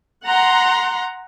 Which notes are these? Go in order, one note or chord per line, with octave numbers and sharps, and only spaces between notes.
F#5 A#5 C6